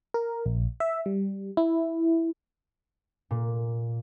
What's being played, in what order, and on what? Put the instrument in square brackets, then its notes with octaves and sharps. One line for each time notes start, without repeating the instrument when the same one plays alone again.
[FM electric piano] A#4
A#1
E5
G3
E4
[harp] A#2